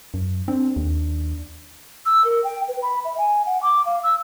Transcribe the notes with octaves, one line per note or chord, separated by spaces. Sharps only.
F#2
C4 D4
D#2
E6
A#4
G5
B4
B5
E5
G#5
F#5
D6
F5
E6